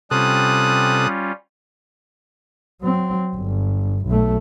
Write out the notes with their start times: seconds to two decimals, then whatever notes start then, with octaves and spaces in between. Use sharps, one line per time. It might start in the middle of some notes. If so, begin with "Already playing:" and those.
0.11 C3 G3 C#4 F4 A4 D#6 F#6
2.82 F#3 C4
3.36 G1
4.07 B1 A3